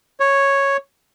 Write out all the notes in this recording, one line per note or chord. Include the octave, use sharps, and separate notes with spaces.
C#5